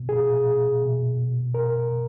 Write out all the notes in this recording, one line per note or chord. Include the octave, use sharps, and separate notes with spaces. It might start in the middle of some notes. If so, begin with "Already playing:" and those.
Already playing: B2
A#2 G#4
A#2
B2
B2
B2 A#4
B2